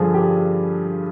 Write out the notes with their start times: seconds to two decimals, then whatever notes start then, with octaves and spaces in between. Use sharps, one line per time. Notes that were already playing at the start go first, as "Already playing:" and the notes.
Already playing: G2 D3 F3 G#4
0.14 G4